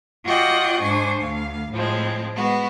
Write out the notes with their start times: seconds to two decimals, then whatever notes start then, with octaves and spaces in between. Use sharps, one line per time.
0.24 F4 F#4 D5 D#5 F#5 G5
0.82 G#2 D4 C5 G#5 C#6
1.20 D2 F5
1.72 A2 F3 G#3 C4
2.33 G#3 B3 F#4